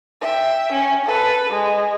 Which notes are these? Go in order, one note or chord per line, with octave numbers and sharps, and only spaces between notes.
E5 G5
C#4
A4 B4
G#3